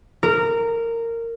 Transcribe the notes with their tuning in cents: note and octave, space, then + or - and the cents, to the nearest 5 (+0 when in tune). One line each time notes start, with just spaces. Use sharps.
A#4 -15